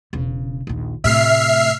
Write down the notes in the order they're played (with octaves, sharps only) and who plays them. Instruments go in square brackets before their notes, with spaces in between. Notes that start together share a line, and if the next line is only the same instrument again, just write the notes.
[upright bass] E1 C#3
A#1 D#2
[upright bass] A2 C3 [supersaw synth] E5 F6 C7